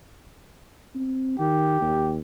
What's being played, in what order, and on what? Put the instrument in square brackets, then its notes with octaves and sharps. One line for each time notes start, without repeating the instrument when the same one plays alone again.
[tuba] C4
[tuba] D#3 [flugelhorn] G4
[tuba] D#2